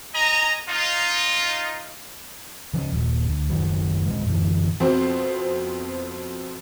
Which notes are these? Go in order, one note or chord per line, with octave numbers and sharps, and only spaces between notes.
D#5 G#5 A#5
D#4 F4
C#3 F3 A3 C#4
D#1 A#1 D#2
D2
F#1 D#3 F#3
D1 B2 F3 G#3
F#2 B2 D3 E3
F2 B2 C4 C5